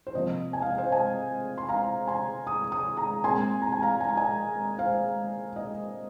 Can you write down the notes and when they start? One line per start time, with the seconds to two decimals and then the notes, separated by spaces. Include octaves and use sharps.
0.07 C5
0.15 C3 F3 A#3 D#5
0.53 G#5
0.62 F5
0.70 D#5
0.78 C5 F5
0.92 D#5 G#5
1.58 C6
1.69 F5 A#5
2.07 G#5 C6
2.47 D#6
2.72 D#6
2.97 A#5 D#6
3.24 A#2 G#3 C4 G#5 C6
3.62 A#5
3.72 G#5
3.82 F5 A#5
4.01 G#5
4.09 A#5
4.17 D#5 G#5
4.78 C5 F5
5.56 D#5